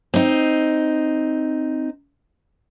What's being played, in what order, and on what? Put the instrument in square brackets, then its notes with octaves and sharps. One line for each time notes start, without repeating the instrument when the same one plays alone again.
[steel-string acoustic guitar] C4 D#4